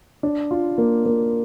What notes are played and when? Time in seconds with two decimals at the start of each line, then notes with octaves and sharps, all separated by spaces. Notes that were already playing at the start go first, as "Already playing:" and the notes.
0.23 D4
0.51 F4
0.78 A#3
1.05 A#3